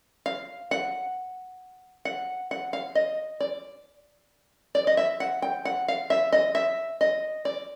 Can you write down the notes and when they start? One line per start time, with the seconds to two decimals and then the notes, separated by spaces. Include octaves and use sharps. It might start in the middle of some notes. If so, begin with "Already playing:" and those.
0.26 F5
0.71 F#5
2.05 F#5
2.51 F#5
2.73 F5
2.95 D#5
3.40 D5
4.75 D5
4.87 D#5
4.97 E5
5.20 F#5
5.42 G5
5.65 F#5
5.88 F5
6.10 E5
6.33 D#5
6.55 E5
7.01 D#5
7.45 D5